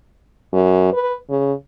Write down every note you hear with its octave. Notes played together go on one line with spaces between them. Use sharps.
F#2
B4
C#3